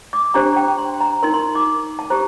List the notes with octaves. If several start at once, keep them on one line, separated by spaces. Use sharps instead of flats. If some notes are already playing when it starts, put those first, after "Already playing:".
D6
D4 G4 C5 A#5
G5
C6
A#5
D#4 A#4 C6
C6
D6
A5
G4 C5 A#5